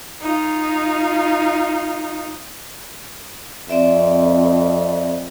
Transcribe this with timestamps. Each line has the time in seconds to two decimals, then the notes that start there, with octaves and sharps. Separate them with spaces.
0.22 D#4 F4
3.69 F2 C4 D5 E5